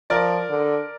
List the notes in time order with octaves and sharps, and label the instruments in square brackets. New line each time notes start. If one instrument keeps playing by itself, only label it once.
[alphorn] F3 [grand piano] A#4 D5
[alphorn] D3